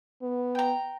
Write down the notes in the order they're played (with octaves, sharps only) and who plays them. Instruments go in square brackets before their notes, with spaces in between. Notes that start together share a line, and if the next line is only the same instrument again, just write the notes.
[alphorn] B3
[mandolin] G5 A#5